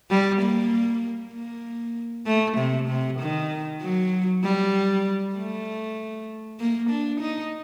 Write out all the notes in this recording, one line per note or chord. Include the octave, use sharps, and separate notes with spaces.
G3
A#3
A#3
A3
C3
C3
D#3
F#3
G3
A3
A#3
D4
D#4